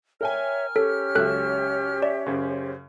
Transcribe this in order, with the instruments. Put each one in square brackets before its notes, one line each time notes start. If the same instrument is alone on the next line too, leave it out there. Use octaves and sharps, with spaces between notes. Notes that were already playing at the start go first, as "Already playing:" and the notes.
[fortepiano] A#4 G5 G#5 [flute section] C#5 E5 [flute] F6
[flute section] C#4 G4 C#5 [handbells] A4
[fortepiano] C#2 F#3 E5 [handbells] A4 F#6
[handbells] D5 [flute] E5
[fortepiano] F#2 C#3 [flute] C5